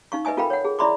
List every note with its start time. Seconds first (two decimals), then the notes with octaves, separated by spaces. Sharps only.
0.12 D#4 F5 C#6
0.25 B4 D#5 E5 G#5 D#6
0.37 F4 A4 A#4 F5 G5 B5
0.50 C#5 F#5
0.65 G#4
0.79 E4 D5 E5 B5 C6 D6